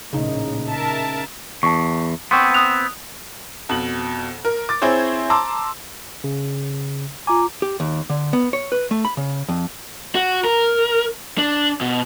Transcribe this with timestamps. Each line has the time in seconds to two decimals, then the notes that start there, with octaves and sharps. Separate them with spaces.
0.13 A#1 A2 C#3 D#4
0.68 A#4 E5 A5
1.63 E2 A5 C#6
2.31 B3 C4 C6 C#6
2.54 D#6 F#6 F7
3.69 F2 B2 F#7
4.45 A#4
4.69 D6 A6
4.82 C4 E4 G#4 C5 C#5
5.30 A5 A#5 C6 D6 E6
6.24 C#3
7.27 F4 G#5 A#5 D6
7.62 G4
7.80 D#2
8.10 D3
8.33 B3
8.53 C#5
8.72 B4
8.91 A3
9.05 B5
9.17 C#3
9.49 F2
10.15 F#4
10.44 A#4
11.38 D4
11.81 B2